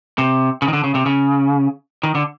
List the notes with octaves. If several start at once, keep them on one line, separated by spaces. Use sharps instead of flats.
C3
C#3
D#3
D3
C#3
C3
C#3
D#3
D3